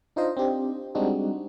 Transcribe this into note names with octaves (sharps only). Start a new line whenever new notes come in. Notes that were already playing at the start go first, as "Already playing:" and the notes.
D4 D#4 F4 C5 D#5
C4 D4 G4
G3 G#3 C4 D4 D#4 F#4